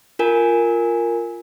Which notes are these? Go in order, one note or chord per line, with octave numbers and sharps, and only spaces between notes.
F4 A#4 G#5